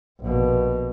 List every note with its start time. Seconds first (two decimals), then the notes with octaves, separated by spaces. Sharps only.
0.20 A#1 B2